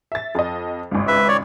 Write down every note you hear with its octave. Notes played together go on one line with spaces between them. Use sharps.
E5 A6
F2 D#5
G#1 C#2
B4 E5
C#5 D5